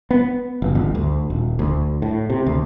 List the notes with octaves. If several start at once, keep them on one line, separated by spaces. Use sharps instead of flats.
B3
F#1
G1
D2
D#1
D2
A2
C3
D2